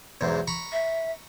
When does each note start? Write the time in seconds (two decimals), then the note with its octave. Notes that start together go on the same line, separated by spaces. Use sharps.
0.21 B1 E2 G#2
0.47 A#5 B5 C#6
0.72 E5